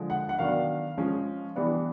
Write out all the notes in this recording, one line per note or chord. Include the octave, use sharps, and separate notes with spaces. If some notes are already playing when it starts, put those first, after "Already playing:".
Already playing: D3 F3 G#3
F#5
F#5
D#3 F#3 B3 D4 F5
F3 G#3 C#4
E3 G3 B3 D4